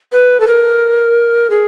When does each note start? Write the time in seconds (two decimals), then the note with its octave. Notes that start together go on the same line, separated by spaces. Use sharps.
0.12 B4
0.40 A4
0.47 A#4
1.50 G#4